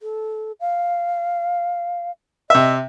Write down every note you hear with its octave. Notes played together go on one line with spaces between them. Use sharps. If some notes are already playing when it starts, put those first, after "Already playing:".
A4
F5
C3 D#5 E5